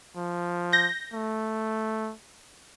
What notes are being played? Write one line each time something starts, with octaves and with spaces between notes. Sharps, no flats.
F3
G6 A#6
A3